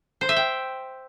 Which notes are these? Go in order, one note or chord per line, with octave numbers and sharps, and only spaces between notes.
C5
E5
G5